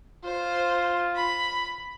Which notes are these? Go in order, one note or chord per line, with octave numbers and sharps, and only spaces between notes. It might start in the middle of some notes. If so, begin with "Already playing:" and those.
F4 C5
B5